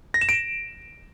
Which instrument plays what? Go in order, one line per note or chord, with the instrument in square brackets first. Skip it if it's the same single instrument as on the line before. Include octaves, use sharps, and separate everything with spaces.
[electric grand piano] A#6
E7
D7